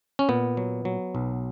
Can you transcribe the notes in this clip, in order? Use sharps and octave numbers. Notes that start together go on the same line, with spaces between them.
C#4
A#2 B3
F#3
F#3
B1